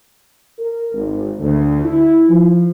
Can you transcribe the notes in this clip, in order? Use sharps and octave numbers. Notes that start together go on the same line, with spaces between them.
A#4
G#1
D2
E4
F3